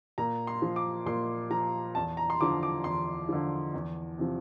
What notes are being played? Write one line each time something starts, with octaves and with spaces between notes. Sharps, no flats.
A#2 A#5
C6
F3
D6
A#2 C6
F3 A#5
E2 A5
A#5
C6
D3 F3 D6
D6
E2 C6
D3 F3
E2
C3 F3